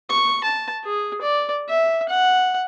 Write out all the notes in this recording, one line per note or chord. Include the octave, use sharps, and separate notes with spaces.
C#6
A5
G#4
D5
E5
F#5